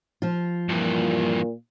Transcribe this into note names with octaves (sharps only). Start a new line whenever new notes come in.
F3 F4
G2 A#2 E3